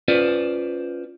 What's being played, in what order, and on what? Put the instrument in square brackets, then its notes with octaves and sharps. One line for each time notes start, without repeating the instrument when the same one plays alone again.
[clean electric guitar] C#4 F4 B4 C5 D5